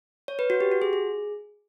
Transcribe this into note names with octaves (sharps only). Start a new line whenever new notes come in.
C#5
B4
F#4
G4
F#4
G#4
G#4